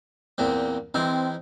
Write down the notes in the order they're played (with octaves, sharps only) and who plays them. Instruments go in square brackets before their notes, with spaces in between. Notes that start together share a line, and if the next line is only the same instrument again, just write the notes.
[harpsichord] E2 A#2 C4
[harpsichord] E3 D#4 G#4 [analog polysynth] C4